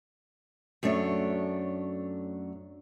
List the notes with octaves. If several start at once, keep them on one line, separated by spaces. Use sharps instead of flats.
F#2 A3 D4 C#5